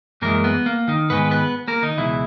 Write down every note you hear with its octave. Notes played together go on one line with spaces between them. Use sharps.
F#2 E3 G#3 A#3 A#4
B3
A#3
D#3 D#4
G#2 D#3 G#3 B3 B4
B3 B4
A#3 A#4
D#3 D#4
C#2 B2 E3 G#3 E4